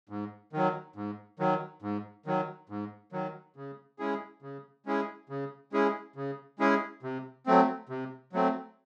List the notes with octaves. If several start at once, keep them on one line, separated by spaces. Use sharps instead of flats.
G#2
D#3 F#3
G#2
D#3 F#3
G#2
D#3 F#3
G#2
D#3 F#3
C#3
G#3 C#4 E4 G#4
C#3
G#3 C#4 E4 G#4
C#3
G#3 C#4 E4 G#4
C#3
G#3 C#4 E4 G#4
C3
F#3 A3 C4
C3
F#3 A3 C4